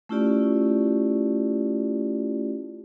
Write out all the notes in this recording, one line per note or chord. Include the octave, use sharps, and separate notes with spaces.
A3 C#4 E4 F4 G4 D5